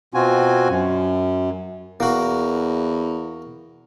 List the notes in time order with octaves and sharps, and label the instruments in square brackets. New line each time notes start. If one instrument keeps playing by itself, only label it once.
[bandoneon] B2 C4 F4 F#4 G#5
F#2
[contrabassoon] E2 [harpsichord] A#3 F#4